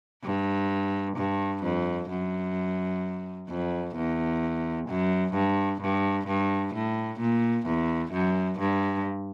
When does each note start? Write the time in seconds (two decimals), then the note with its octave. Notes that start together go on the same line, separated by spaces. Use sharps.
0.24 G2
1.17 G2
1.63 F2
2.10 F#2
3.49 F2
3.95 E2
4.89 F#2
5.34 G2
5.81 G2
6.27 G2
6.74 A2
7.20 A#2
7.67 E2
8.12 F#2
8.59 G2